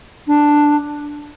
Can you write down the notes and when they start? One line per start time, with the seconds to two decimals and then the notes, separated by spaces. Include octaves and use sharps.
0.27 D4